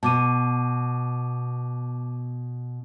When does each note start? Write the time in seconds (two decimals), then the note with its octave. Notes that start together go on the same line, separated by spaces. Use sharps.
0.03 B2 A5 D6 D#7